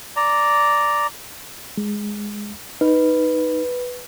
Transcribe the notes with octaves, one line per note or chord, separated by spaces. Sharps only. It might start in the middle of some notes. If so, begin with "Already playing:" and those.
D5 A#5
G#3
D#4 B4